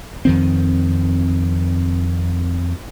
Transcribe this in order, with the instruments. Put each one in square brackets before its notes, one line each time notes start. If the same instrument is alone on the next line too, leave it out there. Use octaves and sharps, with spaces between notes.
[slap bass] F2 D#3 C4